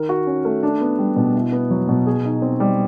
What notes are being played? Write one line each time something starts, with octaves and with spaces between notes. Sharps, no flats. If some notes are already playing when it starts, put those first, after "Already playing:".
Already playing: D#3 A#4
F#4
C#4
A3
D4
B3
G3
B2
E4
B3
F#3
B2
G#4
D#4
C4
G3